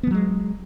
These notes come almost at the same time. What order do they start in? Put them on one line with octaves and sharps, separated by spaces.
B3 F3 F#3 G#3